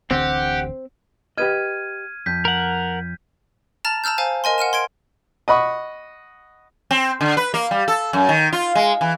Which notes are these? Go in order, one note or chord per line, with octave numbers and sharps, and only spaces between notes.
D1 A1 D3 C4 G4 F#5
G4 B4 D#5 F6 G#6 D#7
F2 G6 B6
A#4 F#5
A5 A#5 F6 A6 F7
A5 A#5 E6 F6 G6
C5 F5 G#5
A#4 D#5 G#5 C6
F#5 F6 D#7 E7
C6 G#6 D7
D#5 F#5 B5 C#6
C4
D3
B4
A#3
G3
A4
F#2
D#3
F4
G#3
E3